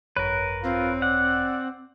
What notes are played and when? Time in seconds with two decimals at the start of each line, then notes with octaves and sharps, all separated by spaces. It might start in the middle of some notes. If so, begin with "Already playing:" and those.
0.17 G#1 F#2 A#4 B4 C#5
0.64 C4 F4
1.02 D5 F#5